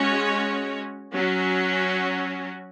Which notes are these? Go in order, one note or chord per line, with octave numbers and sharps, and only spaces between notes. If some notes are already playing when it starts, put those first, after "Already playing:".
Already playing: G#3 C#4 F#4 C#5
F#3 C#4 F#4